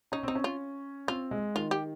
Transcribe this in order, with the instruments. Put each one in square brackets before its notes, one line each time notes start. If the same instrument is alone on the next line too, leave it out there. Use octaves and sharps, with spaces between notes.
[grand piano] C#4 [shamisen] D#4
[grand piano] C4 [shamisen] D#4
[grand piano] C#4
[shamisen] F4
[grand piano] C4 [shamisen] F4
[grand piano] G#3
[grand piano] D#3 [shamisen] F4
[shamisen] G4